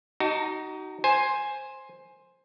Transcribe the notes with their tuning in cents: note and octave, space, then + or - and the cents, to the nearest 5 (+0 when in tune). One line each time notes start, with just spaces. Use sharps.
D#4 +0 F#4 +35 A5 +40
C5 +10 G#5 +0